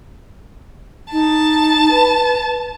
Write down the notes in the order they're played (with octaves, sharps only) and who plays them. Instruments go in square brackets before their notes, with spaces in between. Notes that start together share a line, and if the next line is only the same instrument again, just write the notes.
[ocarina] D#4 [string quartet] A5
[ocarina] B4